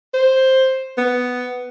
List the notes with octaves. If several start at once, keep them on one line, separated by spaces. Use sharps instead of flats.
C5
B3